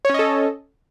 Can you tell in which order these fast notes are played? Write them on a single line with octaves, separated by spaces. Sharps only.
C#5 C#4 D#5 A4